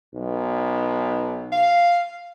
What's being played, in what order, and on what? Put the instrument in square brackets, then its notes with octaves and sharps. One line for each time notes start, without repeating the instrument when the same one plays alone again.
[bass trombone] B1
[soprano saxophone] F5